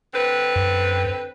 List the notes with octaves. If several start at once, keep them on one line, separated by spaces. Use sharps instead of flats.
D3 C4 B4
F#2